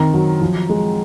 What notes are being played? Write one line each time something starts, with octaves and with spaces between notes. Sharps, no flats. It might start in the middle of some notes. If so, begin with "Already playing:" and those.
Already playing: D#3 C4
F#3
F3
G#3